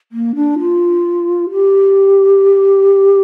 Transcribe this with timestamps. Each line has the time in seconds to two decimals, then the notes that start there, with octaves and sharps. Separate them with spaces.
0.12 A#3
0.35 D4
0.59 F4
1.51 G4